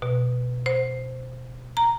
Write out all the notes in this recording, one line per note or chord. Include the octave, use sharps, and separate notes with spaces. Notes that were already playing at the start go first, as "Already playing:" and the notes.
B2
C5
A#5